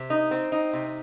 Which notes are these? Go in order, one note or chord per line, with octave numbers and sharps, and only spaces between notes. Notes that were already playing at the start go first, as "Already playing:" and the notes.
Already playing: C3
D#4
C4
D#4
C3